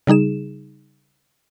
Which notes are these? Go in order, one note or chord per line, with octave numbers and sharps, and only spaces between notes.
C#3 G3 D#4 G#4 E7